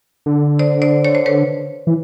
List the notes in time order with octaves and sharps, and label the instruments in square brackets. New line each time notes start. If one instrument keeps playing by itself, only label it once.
[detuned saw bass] D3
[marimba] C5 D5
C5 D5
C#5
C5
B4 C#5
[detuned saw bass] E3